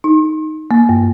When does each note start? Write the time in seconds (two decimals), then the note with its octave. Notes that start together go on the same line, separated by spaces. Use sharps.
0.04 D#4
0.71 A#3
0.89 G2